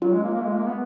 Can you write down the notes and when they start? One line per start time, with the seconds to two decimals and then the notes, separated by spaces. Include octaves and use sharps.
0.02 F#3 C#4 F4
0.13 G#3
0.23 A#3
0.34 A#3
0.45 G#3
0.56 A#3
0.66 B3